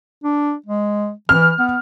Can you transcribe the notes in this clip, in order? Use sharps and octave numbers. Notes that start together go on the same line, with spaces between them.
D4
G#3
E3 F6
B3